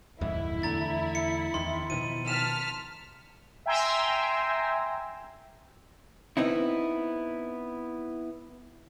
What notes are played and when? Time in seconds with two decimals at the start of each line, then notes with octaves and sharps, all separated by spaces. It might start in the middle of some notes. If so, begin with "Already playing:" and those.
0.21 D1 F2 G#2 E4
0.63 E2 D3 A3 A#5 A6
1.15 C#7
1.54 E2 D#3 C6
1.90 B2 D#3 F3 D#7
2.28 A5 F6 B6 E7
3.66 E5 G5 G#5 A#5 C6 E6
6.37 B3 C4 D#4 E4